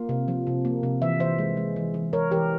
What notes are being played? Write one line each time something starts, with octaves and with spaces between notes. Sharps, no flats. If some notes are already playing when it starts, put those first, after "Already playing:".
Already playing: A#3 F4
C3
F3
C3
A#3
C3
E3 E5
E3 C5 E5
G#3
G#3
E3
E3
E3 A#4 C#5
E3 G4 A#4